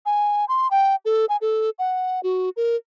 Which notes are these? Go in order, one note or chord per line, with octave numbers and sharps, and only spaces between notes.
G#5
C6
G5
A4
G#5
A4
F#5
F#4
A#4